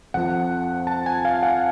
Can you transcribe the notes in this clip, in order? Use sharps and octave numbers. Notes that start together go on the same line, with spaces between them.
F2 F3 F#5
A5
G#5
F5
F#5